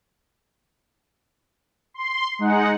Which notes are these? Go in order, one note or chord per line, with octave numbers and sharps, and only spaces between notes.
C6
G#3 D#4 F#5